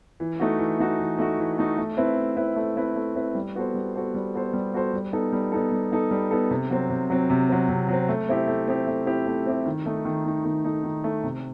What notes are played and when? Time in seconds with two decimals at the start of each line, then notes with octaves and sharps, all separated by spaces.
0.20 E3
0.40 A3 D#4 F#4
0.59 E3
0.79 A3 D#4 F#4
0.99 E3
1.18 A3 D#4 F#4
1.38 E3
1.58 A3 D#4 F#4
1.77 A3
1.97 C4 E4 B4
2.17 A3
2.37 C4 E4 B4
2.56 A3
2.76 C4 E4 B4
2.96 A3
3.15 C4 E4 B4
3.35 G3
3.55 B3 F#4 A4 C5
3.74 G3
3.95 B3 F#4 A4 C5
4.14 G3
4.34 B3 F#4 A4 C5
4.53 G3
4.73 B3 F#4 A4 C5
4.93 G3
5.13 B3 D#4 A4
5.33 G3
5.52 B3 D#4 A4
5.72 G3
5.92 B3 D#4 A4
6.11 G3
6.31 B3 D#4 A4
6.50 C3
6.70 F#3 C4
6.90 C3
7.10 F#3 C4
7.30 C3
7.49 F#3 C4
7.69 C3
7.88 F#3 C4
8.09 A3
8.29 C4 E4 G4
8.47 A3
8.68 C4 E4 G4
8.87 A3
9.06 C4 E4 G4
9.27 A3
9.46 C4 E4 G4
9.66 D#3
9.86 A3 D#4
10.05 D#3
10.25 A3 D#4
10.45 D#3
10.64 A3 D#4
10.84 D#3
11.04 A3 D#4
11.24 C3